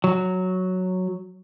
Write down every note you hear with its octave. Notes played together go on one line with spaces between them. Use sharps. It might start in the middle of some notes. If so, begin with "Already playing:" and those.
F#3